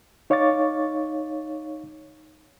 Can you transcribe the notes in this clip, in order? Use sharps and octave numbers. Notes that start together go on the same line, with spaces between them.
D#4 C#5 F5 C#6 D6 A6